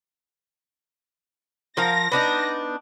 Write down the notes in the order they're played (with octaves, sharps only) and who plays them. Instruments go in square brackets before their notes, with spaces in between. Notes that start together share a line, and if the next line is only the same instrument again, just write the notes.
[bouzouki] F3 A#4 F5 [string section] A#6
[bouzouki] B3 D4 D#4